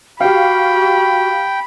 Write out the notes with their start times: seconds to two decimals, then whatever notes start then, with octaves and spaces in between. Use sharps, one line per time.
0.21 F#4 G4 F5 G5 B5